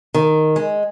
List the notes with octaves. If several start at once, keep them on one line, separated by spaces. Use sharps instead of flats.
D#3
G#3